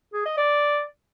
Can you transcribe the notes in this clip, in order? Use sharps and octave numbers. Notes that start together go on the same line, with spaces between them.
G#4
D#5
D5